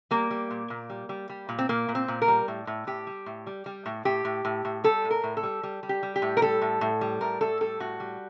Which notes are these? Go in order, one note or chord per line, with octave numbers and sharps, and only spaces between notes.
G3 A#3
G3
A#2
A#2
G3
G3
G3
A#2
C4
A#2 A#3
A#2
C4
A#2
A#4
G3
A2
A2
A2 G4
G3
A2
G3
G3
A2
A2 G4
A2
A2
A2
G3 A4
A2
A#4
A2
A4
G3
G3
G3
G4
G3
G4
A2
A#4
G3 A4
A2
A2
G3
A2 A#4
A2 A4
G3 A4
A2 F#4
G3